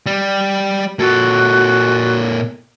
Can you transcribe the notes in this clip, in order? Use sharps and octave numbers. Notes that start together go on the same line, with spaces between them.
G3
A#2 F#4 A4